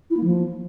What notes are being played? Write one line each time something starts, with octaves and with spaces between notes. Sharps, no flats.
E4
A#3
F3